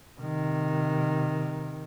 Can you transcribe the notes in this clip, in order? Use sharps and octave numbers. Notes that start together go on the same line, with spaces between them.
C3 D#3